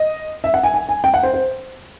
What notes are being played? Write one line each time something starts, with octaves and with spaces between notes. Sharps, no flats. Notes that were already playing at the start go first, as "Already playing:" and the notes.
Already playing: D#5
E5
F#5
G#5
G#5
G#5
G5
F#5
C5
C5